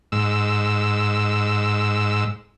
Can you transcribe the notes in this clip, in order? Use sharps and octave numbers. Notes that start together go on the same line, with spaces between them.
G#2 E6